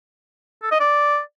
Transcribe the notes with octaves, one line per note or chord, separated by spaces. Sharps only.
A4
D#5
D5